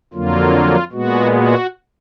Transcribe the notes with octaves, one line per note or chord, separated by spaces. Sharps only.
F2 D3 F#3 A#3 F4
A#2 G#3 B3 F#4
F#4